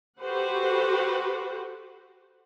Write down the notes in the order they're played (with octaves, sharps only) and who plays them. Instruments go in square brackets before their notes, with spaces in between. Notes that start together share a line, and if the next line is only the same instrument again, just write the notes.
[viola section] F#4 G4 A4 B4 C5 F#5